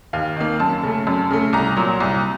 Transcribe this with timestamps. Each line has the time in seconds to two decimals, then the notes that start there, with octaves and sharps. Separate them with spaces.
0.13 D#2 F5
0.36 D#3 A#3
0.59 F#2 A5
0.83 C#3 A3
1.07 F#2
1.31 C#3 A3
1.53 C2 A#5
1.76 A#2 F#3
2.00 C2